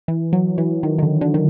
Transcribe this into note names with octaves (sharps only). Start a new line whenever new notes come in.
E3
F#3
E3
D#3
D#3
D3
D3
D#3